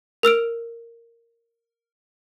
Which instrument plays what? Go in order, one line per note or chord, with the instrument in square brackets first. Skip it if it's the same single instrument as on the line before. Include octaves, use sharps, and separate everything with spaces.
[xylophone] A#4 E6 F6 D7